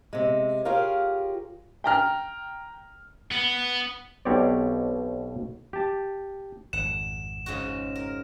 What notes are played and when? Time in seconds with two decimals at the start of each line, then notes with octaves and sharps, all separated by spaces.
0.13 C3 G#3
0.65 F4 G4 G#4 A#4 C#5 F5
1.84 G5 A#5 F6
3.31 B3
4.25 B1 B2 C4 G4 C#5 D5
5.73 G4 A5
6.73 G#1 F2 F#5 E7
7.46 G#2 C#3 F#4
7.95 A#4